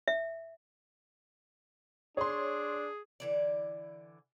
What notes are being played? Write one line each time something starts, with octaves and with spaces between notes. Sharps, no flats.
E5
D4 G#4 C#5 C6
D3 E3 D5